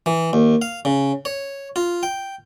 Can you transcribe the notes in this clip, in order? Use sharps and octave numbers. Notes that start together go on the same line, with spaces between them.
E3
D#2
F5
C#3
C#5
F4
G5